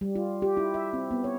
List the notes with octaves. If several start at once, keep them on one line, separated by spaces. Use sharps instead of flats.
G3
F4
G4
E4
E5
C4
B3
C#5